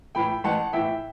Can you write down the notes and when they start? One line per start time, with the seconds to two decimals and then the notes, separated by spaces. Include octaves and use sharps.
0.15 A2 E3 G5 B5
0.44 A1 F#5 A5
0.73 A2 E3 E5 G5